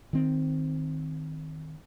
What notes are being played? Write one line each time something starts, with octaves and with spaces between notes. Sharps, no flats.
D#3 C4